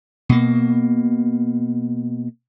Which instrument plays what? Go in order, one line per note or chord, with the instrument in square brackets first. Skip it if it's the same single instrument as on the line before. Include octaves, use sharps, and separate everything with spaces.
[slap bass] B2 A#3